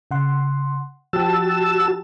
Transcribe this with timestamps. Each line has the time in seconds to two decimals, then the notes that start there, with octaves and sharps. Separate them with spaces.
0.11 C#3 F#5 C6
1.13 F3 F#4 G4 A5 E6